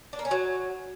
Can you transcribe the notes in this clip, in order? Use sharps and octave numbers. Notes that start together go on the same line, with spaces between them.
D4
A#3
C#4
F#3